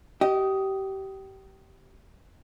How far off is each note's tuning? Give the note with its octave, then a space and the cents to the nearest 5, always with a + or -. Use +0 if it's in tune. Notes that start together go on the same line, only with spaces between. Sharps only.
G4 -25 D#5 +5